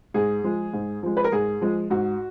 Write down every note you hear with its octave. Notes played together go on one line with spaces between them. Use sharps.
G#2 G#4
F3 G#3
G#2
F3 G#3
B4
A#4
G#2 G#4
F3 G#3
G#2 F#4